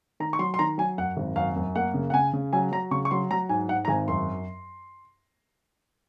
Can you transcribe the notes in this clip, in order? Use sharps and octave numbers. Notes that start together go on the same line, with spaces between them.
D#3 A#5
C#6
F#3 C6
C6
D#3 A#5
F#3 G#5
F#2 F#5
G#1
F#2 F5
F#2
A#3 F#5
C#3
F#5
C#3 G#5
C#3
F#3 G#5
F#3 A#5
C#3 C#6
C#6
F#3 C6
F#3 A#5
G#2 G#5
G#2 F#5
A#5
G#1 G#5
F#2 C6